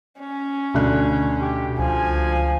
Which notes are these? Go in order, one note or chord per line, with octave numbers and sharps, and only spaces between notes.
C#4
D2 B2 D4 F#6
G4
C#2 F3 G#5